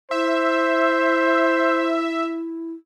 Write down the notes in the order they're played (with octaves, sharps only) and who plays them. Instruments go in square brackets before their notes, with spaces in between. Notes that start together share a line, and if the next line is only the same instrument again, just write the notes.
[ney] E4 [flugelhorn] C5 [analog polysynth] E5